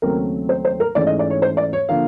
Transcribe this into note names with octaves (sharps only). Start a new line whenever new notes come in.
D#2 C#3 F#3 A3 C4 A#4
C5
C5
A#4
G#2 E3 A3 C#4 D5
D#5
D5
C#5
C5
D5
C#5
D3 F3 A#3 F5